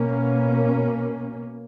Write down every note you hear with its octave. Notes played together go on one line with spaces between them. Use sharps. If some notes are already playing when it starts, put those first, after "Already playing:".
Already playing: B2 A#3 C#4